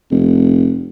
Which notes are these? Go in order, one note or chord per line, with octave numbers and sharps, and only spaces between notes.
F1